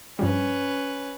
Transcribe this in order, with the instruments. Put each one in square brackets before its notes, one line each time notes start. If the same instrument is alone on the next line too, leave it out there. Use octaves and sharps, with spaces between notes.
[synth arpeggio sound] G2 F3 G3 [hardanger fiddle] C#4 B4